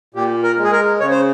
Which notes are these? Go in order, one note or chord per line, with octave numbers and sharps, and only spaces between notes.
A#2 G4
A#4
G#3
G#4
A#4
C#3 C#5
C5